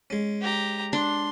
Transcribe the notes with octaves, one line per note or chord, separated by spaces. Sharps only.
G#3 C#4
G4 A#5
D4 C6